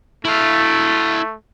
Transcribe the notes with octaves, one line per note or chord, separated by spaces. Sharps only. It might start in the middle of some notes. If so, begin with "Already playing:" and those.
A3 E4 F5